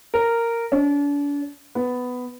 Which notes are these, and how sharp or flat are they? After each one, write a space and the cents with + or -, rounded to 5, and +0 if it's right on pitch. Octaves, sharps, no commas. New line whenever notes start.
A#4 -10
D4 -40
B3 +10